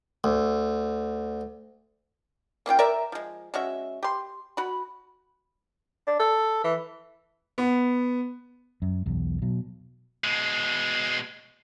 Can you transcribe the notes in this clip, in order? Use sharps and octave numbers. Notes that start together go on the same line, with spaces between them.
D2
A#3 C#4 F4 G5
A#4 D5 E5
F3 G#3
G#3 C#4 F#4 E5
G4 C6
F#4 B5
D4
A4
E3
B3
F#2
B1 E2
B2 F#3
B2 G#3